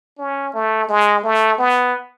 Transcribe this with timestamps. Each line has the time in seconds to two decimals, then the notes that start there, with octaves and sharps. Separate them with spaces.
0.19 C#4
0.54 A3
0.89 G#3
1.23 A3
1.58 B3